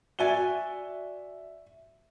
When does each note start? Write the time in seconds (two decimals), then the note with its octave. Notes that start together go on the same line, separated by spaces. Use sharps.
0.19 F#4 D5 E5 G#5 G7